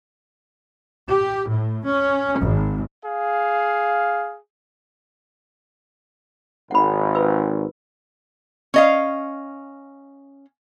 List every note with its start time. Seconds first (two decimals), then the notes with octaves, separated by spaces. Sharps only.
1.07 G4
1.48 A2
1.86 C#4
2.39 G#1
3.05 G#4 F5
6.71 G#1 F#5 B5
7.15 F4 B4 E6
8.74 C#4 D#5 F5